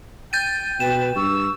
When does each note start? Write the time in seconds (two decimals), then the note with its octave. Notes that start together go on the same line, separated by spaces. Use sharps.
0.33 G5 G6 A6 D#7
0.80 B2 B4 G5 E7
1.16 G2 C#6 E6